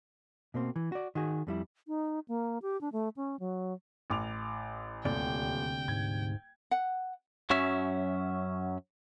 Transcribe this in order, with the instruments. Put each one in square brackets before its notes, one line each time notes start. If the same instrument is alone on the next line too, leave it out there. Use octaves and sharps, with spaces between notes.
[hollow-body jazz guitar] B2 A#3 C4
E3
F#4 D5
D#3 F#4 G#4
F2 G3 E4
[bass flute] D#4
A#3
G4
D4
A3
C#4
F#3
[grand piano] A1 D6 F7
[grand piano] D#1 [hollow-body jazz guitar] D2 C3 D5 [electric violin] G5
[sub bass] G#2 [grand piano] G#6
[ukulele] F#5
[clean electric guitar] F#2 F#3 C#4 E5